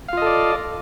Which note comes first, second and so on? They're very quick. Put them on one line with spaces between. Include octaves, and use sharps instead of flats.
F5 F4 D#5 A4 D5